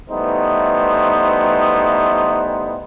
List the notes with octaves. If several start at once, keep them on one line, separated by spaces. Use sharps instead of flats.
E3 G3 A3 B3 D#4 C5